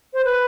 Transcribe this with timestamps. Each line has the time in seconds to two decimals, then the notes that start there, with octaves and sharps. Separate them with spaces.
0.13 C5
0.24 B4